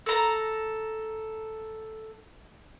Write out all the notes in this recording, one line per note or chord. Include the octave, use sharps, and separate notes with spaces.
A4 A#5